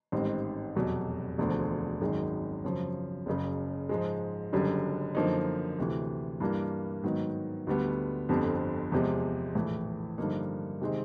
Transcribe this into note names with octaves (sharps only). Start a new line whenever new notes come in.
A1 G#2 D#3 G3 C4
F1 E2 B2 F#3
E1 D2 D3 F3
G#1 F#2 D#3 G#3
F#2 C#3 F3
F#1 F#2 C#3
G#2 F3 G#3
F#1 F#2 D3 G3
F#2 D3 F3 A#3 D#4
D2 C3 E3
G2 E3 G3 A#3 D4
G#2 D#3 F#3 B3
D2 D3 G3 B3
G1 F2 D3 G3 C4
E2 C3 F3 G#3
A#1 A2 E3
G2 D3 F3 A#3 D#4
C3 D#3 G#3 C4